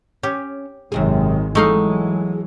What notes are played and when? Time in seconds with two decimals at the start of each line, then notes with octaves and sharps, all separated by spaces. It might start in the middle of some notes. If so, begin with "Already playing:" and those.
0.23 C#4 G4
0.92 G#1 F#2 C3 D#3 G#3 G#4
1.55 E3 F#3 G#3 A3 D#4 F5